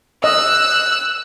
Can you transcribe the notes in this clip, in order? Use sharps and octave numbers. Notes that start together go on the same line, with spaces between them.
D#5 E6 F#6